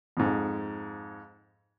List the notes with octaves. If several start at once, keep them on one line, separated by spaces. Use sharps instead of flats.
F2 G#2